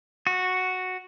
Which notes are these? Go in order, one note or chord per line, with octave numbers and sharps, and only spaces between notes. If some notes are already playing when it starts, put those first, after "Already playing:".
F#4